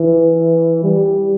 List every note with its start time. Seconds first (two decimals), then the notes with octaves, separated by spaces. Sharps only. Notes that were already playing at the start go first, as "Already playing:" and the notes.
Already playing: E3
0.84 G3